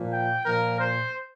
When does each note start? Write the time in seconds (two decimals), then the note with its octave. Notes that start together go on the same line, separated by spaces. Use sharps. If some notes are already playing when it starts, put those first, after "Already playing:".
Already playing: A#2 F3
0.10 G5
0.43 A#2 F3 A#4
0.77 C5